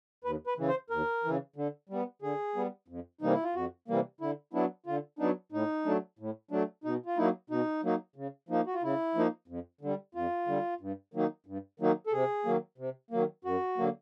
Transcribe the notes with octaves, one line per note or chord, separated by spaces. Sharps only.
D#2 B4
B4
C#3 E3
C5
D#2 A#4
C#3 E3
D3
G3 B3
D3 G#4
G3 B3
F2
C3 E3 G3 A#3 D#4
E4
F4
F2 F#4
C3 E3 G3 A#3
D3 E4
F#3 B3 D4 E4
D3 F4
F#3 B3 D4 D#4
A2 D#4
F#3 A3 D4
A2
F#3 A3 D4
B2 D#4
F4
F#3 A#3 D#4 E4
B2 D#4
F#3 A#3 D#4
C#3
F3 A#3 D#4
F#4
F4
C#3 E4
F3 A#3 D#4
F2
D3 G3
F2 F4
D3 G3
G2
D#3 F#3 A#3 D#4
G2
D#3 F#3 A#3 D#4
A4
C3 G#4
D#3 F#3 A#3
C3
D#3 F#3 A#3
F#2 F#4
D3 F#3 A#3